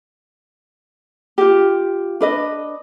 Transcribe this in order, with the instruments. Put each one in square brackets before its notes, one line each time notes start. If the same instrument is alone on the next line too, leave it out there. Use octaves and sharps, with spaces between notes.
[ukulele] F4 G4
D4 B4 D#5